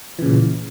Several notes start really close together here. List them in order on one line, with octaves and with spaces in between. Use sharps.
E3 C#3 A#2